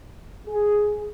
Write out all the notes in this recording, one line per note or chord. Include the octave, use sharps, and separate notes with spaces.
G#4